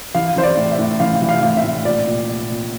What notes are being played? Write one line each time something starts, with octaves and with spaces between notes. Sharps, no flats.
E3 F5
E3 C5
D5
A2
E5
A2
E3 F5
E3
F5
A2
E5
A2
A#2 D5
A#2
A#2
A#2